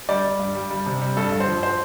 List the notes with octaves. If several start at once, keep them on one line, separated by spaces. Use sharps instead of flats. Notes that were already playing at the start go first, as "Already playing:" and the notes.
G3 D5
G3
G2
G3
G3
C3
G3
G2 A4
G2
C5
F3
C5